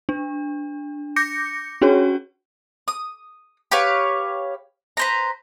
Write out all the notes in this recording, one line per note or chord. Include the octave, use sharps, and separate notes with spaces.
D4
D6 G6 A#6 C#7
C#4 D4 F#4 G#4 C#5
D#6
G4 B4 C#5 F5
B4 C5 A#5